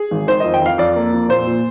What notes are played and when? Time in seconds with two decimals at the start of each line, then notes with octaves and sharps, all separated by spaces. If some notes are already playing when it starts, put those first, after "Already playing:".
Already playing: G#4
0.11 G#1
0.27 D#3 C5
0.40 F2 D#5
0.54 G5
0.62 F2 F5
0.78 F2 D5
0.96 A#3
1.13 F2
1.29 A#2 C5
1.47 A#2